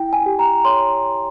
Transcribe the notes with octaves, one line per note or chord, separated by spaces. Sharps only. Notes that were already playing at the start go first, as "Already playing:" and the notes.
Already playing: E4 G5
G#5
G4
A#5
C#5 C6